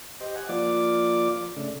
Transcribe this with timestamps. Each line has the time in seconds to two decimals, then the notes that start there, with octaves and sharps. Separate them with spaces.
0.21 G4 C5 D#5
0.36 F#5 G#5
0.49 F3 A#3 F4 D5 D6
1.57 C#3 A3 D4